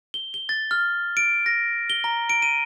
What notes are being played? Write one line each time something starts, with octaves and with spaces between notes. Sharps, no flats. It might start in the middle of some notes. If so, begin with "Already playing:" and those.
G7
G7
A6
F6
D7
A#6
G7
A#5
D7
D#7